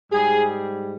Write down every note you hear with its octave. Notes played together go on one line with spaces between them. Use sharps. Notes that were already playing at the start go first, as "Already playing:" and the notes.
G#2 G3 G#4